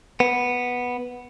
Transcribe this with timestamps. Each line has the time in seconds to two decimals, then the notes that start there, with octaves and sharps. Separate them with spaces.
0.20 B3